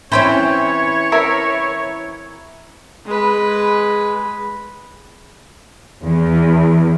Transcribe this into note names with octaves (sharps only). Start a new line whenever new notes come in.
E3 C4 C#4 C5 C#5 B5
A#4 E5 B5
G#3 B4
E2